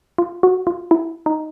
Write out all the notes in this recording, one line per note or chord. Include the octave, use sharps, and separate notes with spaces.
F4
F#4
F4
E4
D#4